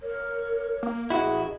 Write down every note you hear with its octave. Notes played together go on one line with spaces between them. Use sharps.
A#4 C#5
A#3
A1 E4 F#4 G#4 D#5